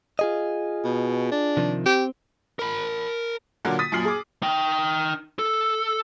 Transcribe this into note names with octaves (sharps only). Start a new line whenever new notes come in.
F4 G#4 D#5
B2
D4
C3 D#3 F3
C4 G4
A#4 B5
A#2 D3 F#3 A#3 F4
D#6 A6 B6 D#7
F#2 A#2 F6 C7 F#7
G#4 D6
D#4 G5
A4